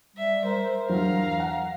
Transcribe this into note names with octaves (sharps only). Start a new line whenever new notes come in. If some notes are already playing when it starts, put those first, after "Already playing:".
G3 E5
A#4 C5
E2 F#3 D4 F5 A#5
F#5